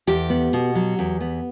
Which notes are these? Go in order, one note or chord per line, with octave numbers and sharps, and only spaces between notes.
E2 G4
B3
B2
F#3
E2
B3